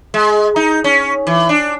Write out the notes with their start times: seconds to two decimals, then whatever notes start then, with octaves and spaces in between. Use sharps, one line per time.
0.14 G#3
0.56 D#4
0.84 C#4
1.27 E3
1.49 D4